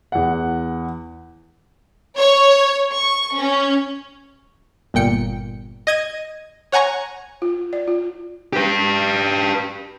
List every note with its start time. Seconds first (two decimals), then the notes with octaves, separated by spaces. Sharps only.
0.12 E2 F#5
2.16 C#5
2.94 C#6
3.34 C#4
4.94 G1 A#2 G5 C#7
5.87 D#5 G#6 D#7
6.72 C#5 F#5 G#5 A#5 C#6
7.42 F4
7.73 D5
7.88 F4
8.53 G4 B4